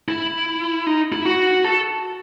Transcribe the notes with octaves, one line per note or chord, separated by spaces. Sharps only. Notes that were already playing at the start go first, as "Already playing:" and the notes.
E4
D#4
E4
F#4
A4